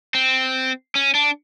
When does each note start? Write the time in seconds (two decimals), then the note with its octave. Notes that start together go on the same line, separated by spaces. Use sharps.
0.15 C4
0.95 C#4
1.15 D4